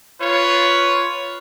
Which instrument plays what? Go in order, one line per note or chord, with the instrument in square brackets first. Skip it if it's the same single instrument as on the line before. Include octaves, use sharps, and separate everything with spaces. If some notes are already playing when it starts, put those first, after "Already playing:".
[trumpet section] F4 B4 C#5